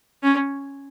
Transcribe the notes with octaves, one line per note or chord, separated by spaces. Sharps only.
C#4